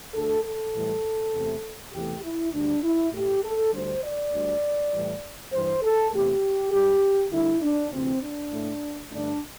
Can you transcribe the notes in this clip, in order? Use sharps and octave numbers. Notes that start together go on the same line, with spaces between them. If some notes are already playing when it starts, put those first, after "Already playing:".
D2 D3 A3 A4
A4
A2 E3 G3
E2 C3 A3
E2 C3 E3 A3 G4
E4
D2 D3 G3 D4
E4
A2 A3 G4
A4
D2 D3 G3 C5
D5
D2 D3 G3
A2 E3 G3
G2 E3 G3 C5
A4
E2 C3 A3 G4
G2 G3 G4
D2 D3 G3 E4
D4
D2 C3 E3 C4
D4
A2 A3
G2 D3 A3 D4